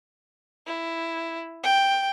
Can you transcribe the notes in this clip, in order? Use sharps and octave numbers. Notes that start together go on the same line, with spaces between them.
E4
G5